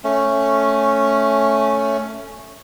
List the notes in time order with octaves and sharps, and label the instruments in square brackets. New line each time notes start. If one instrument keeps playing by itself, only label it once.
[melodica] A3 C#4